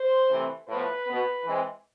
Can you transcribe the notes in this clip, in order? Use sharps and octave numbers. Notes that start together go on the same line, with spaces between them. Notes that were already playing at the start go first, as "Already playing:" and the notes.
Already playing: C5
C3 E3 A3 C4
A2 F3 B3 B4
B2 B3
E3 G#3 C4